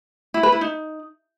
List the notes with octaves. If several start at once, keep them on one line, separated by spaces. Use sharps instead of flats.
E4
B4
E4
D#4